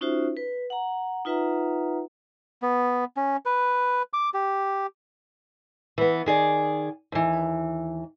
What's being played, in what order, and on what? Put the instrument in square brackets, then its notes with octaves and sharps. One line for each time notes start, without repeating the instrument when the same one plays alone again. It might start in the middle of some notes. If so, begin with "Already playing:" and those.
[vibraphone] C#4 D#4 F4 F#4 C5 E5
B4
F#5 A#5
D#4 F4 B4 E5 F#5 A#5
[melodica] B3
C#4
B4
D6
G4
[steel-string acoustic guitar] E3 B3
D#3 G#4 D5
D#2 E3